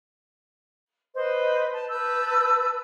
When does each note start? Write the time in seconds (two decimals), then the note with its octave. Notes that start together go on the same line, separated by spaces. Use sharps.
1.15 B4 C5 D#5
1.73 A5
1.90 B4 A5 E6 G6